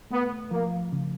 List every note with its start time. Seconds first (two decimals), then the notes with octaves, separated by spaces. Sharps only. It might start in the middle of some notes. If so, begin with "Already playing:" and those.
0.11 A3 B3
0.51 F3 A#3
0.92 C#3